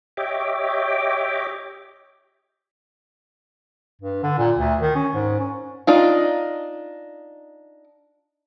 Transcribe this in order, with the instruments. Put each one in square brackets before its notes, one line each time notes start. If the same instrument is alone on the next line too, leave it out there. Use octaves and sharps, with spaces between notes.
[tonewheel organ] G4 C#5 D#5 E5 G5 D6
[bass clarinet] G2
D3
A#2
D2
D#3
C#4
G#2
C#4
[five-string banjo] D4 D#4 F4